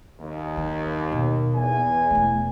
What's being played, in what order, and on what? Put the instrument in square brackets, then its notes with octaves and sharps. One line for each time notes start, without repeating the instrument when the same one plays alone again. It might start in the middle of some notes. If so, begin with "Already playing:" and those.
[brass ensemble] D#2
[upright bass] D#3
B2
[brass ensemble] E2 G#5
[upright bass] E1 A3